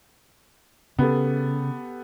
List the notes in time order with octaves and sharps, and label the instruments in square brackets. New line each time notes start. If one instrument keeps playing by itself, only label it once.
[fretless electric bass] C#3 [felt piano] B3 G4 A4